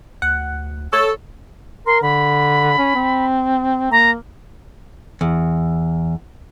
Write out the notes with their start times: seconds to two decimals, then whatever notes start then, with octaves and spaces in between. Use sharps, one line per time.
0.22 D2 F#5
0.93 A4 C#5
1.86 A#4 C6
2.02 D3 B5
2.78 C#4
2.95 C4
3.91 A#3 A#5
5.21 E2